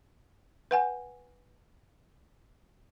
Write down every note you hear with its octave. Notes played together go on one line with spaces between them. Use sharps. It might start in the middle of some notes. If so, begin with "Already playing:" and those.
B4 F#5 G#5